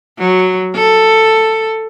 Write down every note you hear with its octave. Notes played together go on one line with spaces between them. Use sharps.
F#3
A4